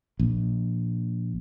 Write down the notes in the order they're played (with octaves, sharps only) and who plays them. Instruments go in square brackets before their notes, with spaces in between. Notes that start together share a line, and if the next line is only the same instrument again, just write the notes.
[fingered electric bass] A#1